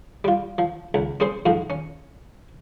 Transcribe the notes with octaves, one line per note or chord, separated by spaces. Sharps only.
G3 F4
F3
C#2
C4 C#4 G#4 C5 C6
F2 G#2 F3
C#4